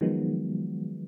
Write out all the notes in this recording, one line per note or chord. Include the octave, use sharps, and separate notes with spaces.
D#3 F3 F#3 G#3 B3